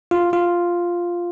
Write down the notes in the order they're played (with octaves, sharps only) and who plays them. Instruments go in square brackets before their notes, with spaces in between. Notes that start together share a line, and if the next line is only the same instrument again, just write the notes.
[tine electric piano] F4
F4